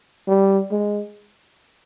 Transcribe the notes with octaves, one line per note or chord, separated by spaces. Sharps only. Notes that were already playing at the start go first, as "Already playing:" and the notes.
G3
G#3